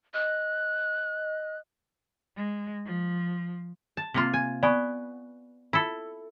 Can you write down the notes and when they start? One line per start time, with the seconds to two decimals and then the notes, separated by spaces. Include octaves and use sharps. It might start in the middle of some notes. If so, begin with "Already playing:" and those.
0.14 D#5 F#6
2.37 G#3
2.86 F3
3.97 A5
4.14 C3 A#3 F4
4.34 G#5
4.63 B3 D5 G#5 C#6
5.73 E4 F4 A4